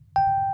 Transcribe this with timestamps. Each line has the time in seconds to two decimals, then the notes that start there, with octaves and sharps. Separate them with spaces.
0.16 G5